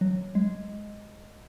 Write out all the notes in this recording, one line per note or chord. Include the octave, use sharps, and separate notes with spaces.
F#3
G#3